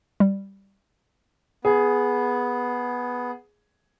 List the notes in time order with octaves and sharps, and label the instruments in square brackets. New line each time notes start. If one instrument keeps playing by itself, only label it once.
[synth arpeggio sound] G3
[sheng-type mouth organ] B3 [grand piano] G#4